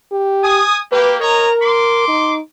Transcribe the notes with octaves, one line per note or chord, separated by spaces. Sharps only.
G4
G#5 D#6
A#3 G4 B4
A#4 C#5 D#5 A#5
C6 D6
D#4